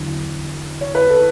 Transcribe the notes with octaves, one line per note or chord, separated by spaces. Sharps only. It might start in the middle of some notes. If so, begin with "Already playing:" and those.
Already playing: E2 D3 F#3
C#5
B4
A4